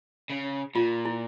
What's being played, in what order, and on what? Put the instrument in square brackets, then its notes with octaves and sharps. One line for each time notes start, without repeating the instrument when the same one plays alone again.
[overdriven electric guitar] C#3
[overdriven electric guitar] A#2 [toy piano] F4
[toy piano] E4